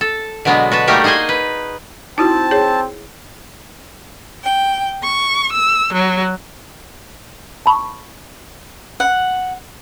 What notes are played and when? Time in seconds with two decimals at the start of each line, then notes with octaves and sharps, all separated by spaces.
0.01 A4
0.45 B2 D3 F#3 G#3 B3
0.72 F#4 B4 A5
0.88 G3 A3 A#3 D#4 F#4 G4
1.04 D#4 G#4 C5 D#5 G#5
1.29 B4
2.18 C4 D#4 E4 F#4 A5
2.51 G#4 C#5
4.44 G5
5.03 C#6
5.52 E6
5.92 F#3
7.66 A5 B5 C#6
9.00 F#5